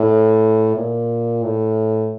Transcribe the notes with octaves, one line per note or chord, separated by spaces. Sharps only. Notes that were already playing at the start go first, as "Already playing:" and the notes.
Already playing: A2
A#2
A2